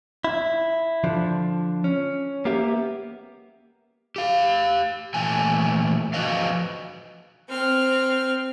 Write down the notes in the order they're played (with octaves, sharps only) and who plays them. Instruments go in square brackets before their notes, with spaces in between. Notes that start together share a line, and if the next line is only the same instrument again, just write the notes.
[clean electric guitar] E4
D3 F3 D4
C#4
A#3 B3 G4 E5
[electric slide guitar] G4 F5
A#2 E3 A3 G#5
F3 A3 F#4 B4 D#5 F5
[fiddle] C4 F6